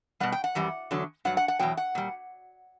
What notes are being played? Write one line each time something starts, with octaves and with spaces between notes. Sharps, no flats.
B2 G3 F#5
G5
F#5
F#2 E3 G3
E2 D3 F#3
G2 F#3 F#5
F#5
F#5
E2 B2 F#3 G5
F#5
A#2 G3